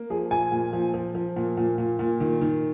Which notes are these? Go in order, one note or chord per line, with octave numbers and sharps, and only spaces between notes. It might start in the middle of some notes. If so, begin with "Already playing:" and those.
Already playing: A#3
F3 G#4
A#2 G#5
A#2
F3
F3
F3
A#2
A#2
A#2
A#2
D#3
D#3